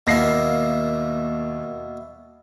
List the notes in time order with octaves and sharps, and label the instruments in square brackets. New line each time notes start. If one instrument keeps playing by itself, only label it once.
[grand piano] D#2 A#6 C7 [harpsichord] B2 A#3 E4